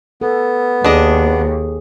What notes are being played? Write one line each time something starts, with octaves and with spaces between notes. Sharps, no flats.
B3 A4
D#2 D4 G#4 D#5